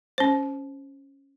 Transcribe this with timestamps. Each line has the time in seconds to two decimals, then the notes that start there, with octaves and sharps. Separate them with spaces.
0.18 C#4 C5